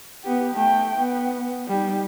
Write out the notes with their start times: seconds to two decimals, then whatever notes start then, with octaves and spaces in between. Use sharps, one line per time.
0.24 B3 G4
0.55 A3 G5
0.97 B3
1.68 G3 D#4